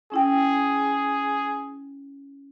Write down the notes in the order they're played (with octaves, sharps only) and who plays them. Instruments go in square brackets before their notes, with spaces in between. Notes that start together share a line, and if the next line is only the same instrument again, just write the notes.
[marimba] C#4 E4 G5 [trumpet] G#4